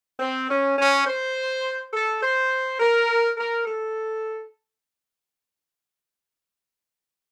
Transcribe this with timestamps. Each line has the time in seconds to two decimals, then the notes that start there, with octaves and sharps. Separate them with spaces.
0.20 C4
0.49 C#4
0.78 C#4
1.06 C5
1.93 A4
2.22 C5
2.79 A#4
3.37 A#4
3.65 A4